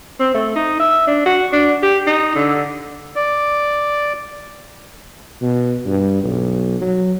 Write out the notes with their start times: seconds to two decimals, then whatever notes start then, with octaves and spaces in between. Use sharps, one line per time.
0.20 C4
0.35 A3
0.56 D#4
0.80 E5
1.07 D4
1.26 F#4
1.53 D4
1.83 G4
2.07 D#4
2.35 D3
3.16 D5
5.42 B2
5.86 G2
6.23 B1
6.81 F#3